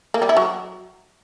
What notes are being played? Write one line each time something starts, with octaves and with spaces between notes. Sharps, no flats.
A#3
G3
E4
F#3